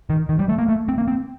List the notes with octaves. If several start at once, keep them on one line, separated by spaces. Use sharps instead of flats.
D#3
D#3
G3
A3
A#3
A3
C4
A#3
C4